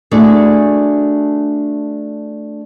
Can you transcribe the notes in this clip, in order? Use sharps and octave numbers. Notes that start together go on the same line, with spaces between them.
A3 D4 E4 F#4 G#4